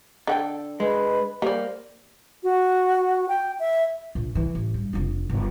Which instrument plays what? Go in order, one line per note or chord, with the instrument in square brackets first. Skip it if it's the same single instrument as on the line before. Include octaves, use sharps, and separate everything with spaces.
[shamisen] D3 F#5 G5 [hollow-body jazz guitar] A4
[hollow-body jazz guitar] G#3 [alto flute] B4
[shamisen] G3 D5 [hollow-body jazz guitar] A#3 [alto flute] C5
[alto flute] F#4
G5
E5
[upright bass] A#1
E3
A1
G2
F1 D4
G1